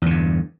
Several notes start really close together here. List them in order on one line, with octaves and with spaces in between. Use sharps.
E2 D3 G2